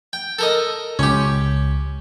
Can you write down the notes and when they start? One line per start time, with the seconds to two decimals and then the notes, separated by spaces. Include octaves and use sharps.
0.13 G5
0.39 A4 A#4 D#5
0.99 C#2 C#4 G4